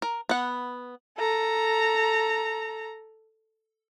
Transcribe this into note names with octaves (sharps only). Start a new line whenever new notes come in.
A#4
B3 F#5
A4 A#5